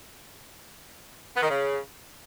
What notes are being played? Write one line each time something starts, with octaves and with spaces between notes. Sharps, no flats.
B3
D#3
C#3